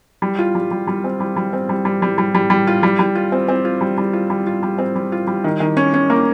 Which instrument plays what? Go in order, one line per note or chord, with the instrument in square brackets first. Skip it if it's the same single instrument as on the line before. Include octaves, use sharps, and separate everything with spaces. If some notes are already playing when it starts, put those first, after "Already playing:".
[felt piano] G3
F4
G3
G3
G3
C4
G3
G3
C4
G3
G3
G3
G3
G3
G3
F4
G3
G3
F4
C4
C4
F4
G3
G3
F4
G3
F4
G3
C4
G3
F4
G3
D#3
D#3
C#4
C#4
A#3